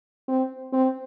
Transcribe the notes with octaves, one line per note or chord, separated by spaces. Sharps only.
C4
C4